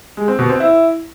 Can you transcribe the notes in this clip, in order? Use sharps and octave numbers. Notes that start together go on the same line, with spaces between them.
G#3
C4
B2
C4
E4